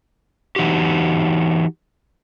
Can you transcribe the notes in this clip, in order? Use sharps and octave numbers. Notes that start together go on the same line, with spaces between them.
E3 D#4 F#4 G4